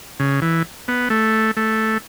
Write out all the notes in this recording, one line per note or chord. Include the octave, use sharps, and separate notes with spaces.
C#3
E3
B3
A3
A3